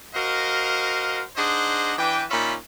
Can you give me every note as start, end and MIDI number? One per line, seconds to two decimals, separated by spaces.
0.15 1.22 66
0.15 1.22 70
0.15 1.22 72
0.15 1.22 75
0.15 1.22 77
1.36 1.93 62
1.36 1.93 63
1.36 1.93 68
1.36 1.93 72
1.36 1.93 75
1.36 1.93 78
1.98 2.23 52
1.98 2.23 62
1.98 2.23 71
1.98 2.23 79
2.30 2.54 46
2.30 2.54 61
2.30 2.54 63
2.30 2.54 65
2.30 2.54 76
2.30 2.54 83